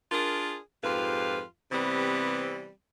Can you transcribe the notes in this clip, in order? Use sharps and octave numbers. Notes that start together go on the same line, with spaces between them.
D4 F4 G#4 A#4
F2 G#2 F4 G4 B4 F5
C3 E3 G3 B3 C4